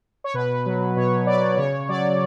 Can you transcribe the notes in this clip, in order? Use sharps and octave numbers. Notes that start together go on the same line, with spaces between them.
C#5
B2 B4
F#3
B2 C#5
F#3 D5
C#3 C#5
F#3 D5